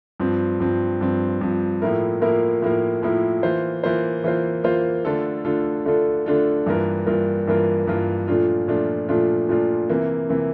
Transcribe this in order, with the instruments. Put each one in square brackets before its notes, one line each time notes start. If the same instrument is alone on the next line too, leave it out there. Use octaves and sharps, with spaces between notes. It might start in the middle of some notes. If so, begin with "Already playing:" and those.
[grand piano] G2 F3 C4
G2 F3 C4
G2 F3 C4
G2 F3 C4
A2 F3 A#3 E4 A#4
A2 F3 A#3 E4 A#4
A2 F3 A#3 E4 A#4
A2 F3 A#3 E4 A#4
E3 A#3 F4 C5
E3 A#3 F4 C5
E3 A#3 F4 C5
E3 A#3 F4 C5
D3 A3 D4 F4 A4
D3 A3 D4 F4 A4
D3 A3 D4 F4 A4
D3 A3 D4 F4 A4
G2 E3 A#3 F4 A#4
G2 E3 A#3 F4 A#4
G2 E3 A#3 F4 A#4
G2 E3 A#3 F4 A#4
A#2 F3 A3 D4 F4
A#2 F3 A3 D4 F4
A#2 F3 A3 D4 F4
A#2 F3 A3 D4 F4
C3 E3 A#3
C3 E3 A#3